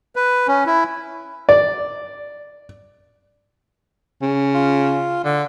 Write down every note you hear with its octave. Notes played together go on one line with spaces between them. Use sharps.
B4
C#4
E4
D5
C#3
F4
D3